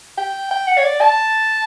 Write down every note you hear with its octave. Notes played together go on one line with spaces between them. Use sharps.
G5
G5
F#5
C#5
D5
A5